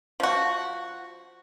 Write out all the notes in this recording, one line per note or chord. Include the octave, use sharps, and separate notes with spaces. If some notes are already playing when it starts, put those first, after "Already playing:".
F3 F#4